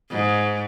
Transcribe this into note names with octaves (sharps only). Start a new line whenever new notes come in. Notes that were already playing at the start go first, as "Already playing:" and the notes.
G#2